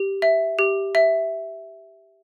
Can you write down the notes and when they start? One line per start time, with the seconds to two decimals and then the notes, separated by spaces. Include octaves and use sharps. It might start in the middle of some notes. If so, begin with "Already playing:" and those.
Already playing: G4
0.22 E5
0.59 G4
0.95 E5